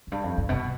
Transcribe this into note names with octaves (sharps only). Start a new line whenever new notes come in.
F2
G2
F2
G2
B2